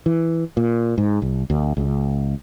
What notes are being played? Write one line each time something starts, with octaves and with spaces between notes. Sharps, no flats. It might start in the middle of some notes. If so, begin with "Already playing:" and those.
E3
A#2
G#2
C2
D2
C#2